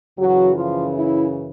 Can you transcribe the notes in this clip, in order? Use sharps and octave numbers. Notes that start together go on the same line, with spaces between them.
F#2 C#3 E3 F#3 F#4
F3 F4
E4